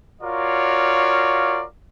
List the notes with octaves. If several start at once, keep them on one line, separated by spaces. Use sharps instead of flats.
F4 F#4 A#4 C#5 D5 F5